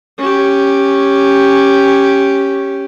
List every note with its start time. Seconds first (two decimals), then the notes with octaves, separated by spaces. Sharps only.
0.19 C#4 G4